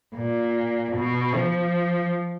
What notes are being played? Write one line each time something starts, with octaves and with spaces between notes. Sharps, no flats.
A#2
B2
F3